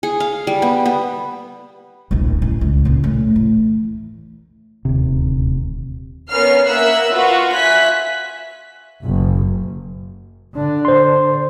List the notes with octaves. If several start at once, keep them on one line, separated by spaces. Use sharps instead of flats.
G#4
F5
G3
B3
B3
D1 A#1
A1
C#2
A#2 C#3
A2
E3
D#1 D2 C3
B3 C#4 A#4 F6 C7
A#3 E5 F#5 E6 F#6
F4 F#4 B4 F5 F#5
E5 G#5 F#6 B6
F#1
D3 D4
C5 C6